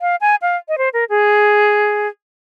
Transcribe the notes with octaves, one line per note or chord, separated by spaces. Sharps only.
F5
G#5
F5
D#5
C5
A#4
G#4